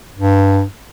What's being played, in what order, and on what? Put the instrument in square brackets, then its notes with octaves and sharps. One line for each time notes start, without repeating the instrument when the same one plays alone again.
[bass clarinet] G2